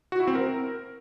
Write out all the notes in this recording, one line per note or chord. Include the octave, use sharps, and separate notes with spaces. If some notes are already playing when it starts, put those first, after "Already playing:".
F#4
E4
C4
A#4